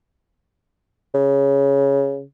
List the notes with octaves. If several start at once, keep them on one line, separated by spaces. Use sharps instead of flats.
C#3